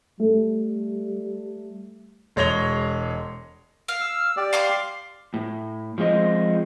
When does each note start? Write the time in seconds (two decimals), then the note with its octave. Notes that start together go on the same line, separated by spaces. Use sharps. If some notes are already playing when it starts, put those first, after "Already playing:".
0.20 G3 A3
2.36 E1 G#3 C#5 A#6 F7 G7
3.88 F5
4.01 E6
4.37 G4 D5
4.53 F5 C6 D6
5.34 A2
5.98 F3 G#3 C4 D#5